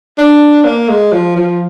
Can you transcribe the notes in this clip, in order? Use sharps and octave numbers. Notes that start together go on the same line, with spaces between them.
D4
A#3
G#3
F3
F3